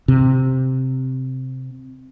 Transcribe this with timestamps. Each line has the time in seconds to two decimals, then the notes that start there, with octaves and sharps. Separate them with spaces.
0.08 C3